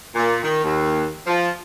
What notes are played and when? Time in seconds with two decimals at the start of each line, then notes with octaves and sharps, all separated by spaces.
0.15 A#2
0.43 D#3
0.64 D#2
1.27 F3